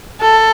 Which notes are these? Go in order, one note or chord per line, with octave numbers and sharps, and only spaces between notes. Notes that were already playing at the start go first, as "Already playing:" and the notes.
A4